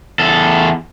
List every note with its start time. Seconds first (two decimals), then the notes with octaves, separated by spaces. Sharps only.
0.20 E2 A4